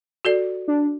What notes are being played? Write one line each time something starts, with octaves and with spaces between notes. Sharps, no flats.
F#4 A4 D5
D4